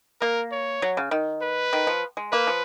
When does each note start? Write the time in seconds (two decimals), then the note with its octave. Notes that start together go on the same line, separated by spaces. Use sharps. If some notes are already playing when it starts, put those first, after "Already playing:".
0.21 A#3 A#4
0.52 C#5
0.82 F#3
0.97 C#3
1.11 D#3
1.42 B4
1.73 D#3
1.87 F3
2.17 G#3
2.32 A#3 B4
2.47 F3